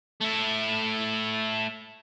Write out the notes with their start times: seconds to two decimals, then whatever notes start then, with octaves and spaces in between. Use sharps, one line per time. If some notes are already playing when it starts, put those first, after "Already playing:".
0.21 A3 E4